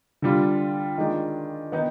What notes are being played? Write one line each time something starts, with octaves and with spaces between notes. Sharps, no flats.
D3 G3 D4 F4
D#3 G#3 D4 F4
D#3 B3 D#4